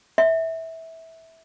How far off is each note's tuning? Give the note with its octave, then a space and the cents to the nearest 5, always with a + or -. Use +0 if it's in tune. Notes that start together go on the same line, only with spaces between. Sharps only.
E5 -15